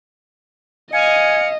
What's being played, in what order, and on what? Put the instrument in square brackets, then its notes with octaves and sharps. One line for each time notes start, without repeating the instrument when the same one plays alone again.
[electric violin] D#5 [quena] F5 [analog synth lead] G#5 [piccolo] C#7